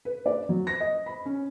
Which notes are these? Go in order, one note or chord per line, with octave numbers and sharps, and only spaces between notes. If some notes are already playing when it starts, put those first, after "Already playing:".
B4
D5
F#3
A#6
D#5
B5
C#4